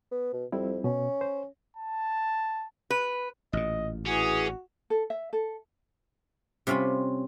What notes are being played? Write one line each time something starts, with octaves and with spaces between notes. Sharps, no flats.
B3
B2
F2 G3 C4 E4
B2 C#4
C5
A5
B4
A1 A#2 D#5
E3 C#4 F#4 G#4
A4
E5
A4
C3 G3 C#4 F4 B5